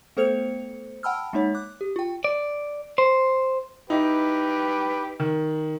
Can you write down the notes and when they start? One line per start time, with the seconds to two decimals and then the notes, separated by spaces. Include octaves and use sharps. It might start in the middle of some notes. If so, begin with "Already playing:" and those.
0.17 A3 B3 A4 C5 C#7 F7
1.03 F#5 G5 A5 B5 E6 F6
1.33 G#3 A#3 D#4 C#5
1.55 D6 F#6
1.81 G4
1.96 F4 G5
2.24 D5
2.98 C5
3.90 D#4 E4 G4 B4
5.20 D#3